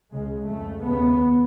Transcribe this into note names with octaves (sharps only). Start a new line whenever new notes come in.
C#2 C#3 G#3
F2 C#3 A3
D#2 C#3 B3